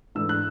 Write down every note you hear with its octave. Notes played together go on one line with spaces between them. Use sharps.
G#2 E3 A3 D4 E6
F#6